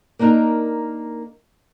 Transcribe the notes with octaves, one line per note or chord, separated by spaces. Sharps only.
A#3 D4 D#4 A#4